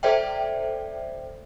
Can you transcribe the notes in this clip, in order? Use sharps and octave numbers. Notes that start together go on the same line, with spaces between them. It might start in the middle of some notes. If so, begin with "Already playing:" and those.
A4 C5 D5 E5 G5